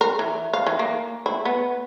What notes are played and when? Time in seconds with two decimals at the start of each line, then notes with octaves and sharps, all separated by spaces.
0.01 A#4
0.19 E3
0.53 F5
0.67 E3
0.79 A#3
1.26 E4
1.45 B3